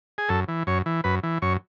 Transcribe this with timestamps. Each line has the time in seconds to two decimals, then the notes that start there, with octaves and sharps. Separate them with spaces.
0.18 G#4
0.29 F#2 A4
0.48 E3
0.67 F#2 C#5
0.86 E3
1.04 F#2 B4
1.23 E3
1.42 F#2 C#5